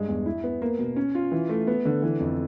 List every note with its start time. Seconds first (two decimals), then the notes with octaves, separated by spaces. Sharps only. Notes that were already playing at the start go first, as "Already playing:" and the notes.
Already playing: G2 G#3
0.08 E2
0.26 E4
0.44 B3
0.62 A#3
0.79 B2
0.96 C#4
1.15 F4
1.32 E3
1.49 A3
1.67 B3
1.85 D3
2.02 E3
2.20 F2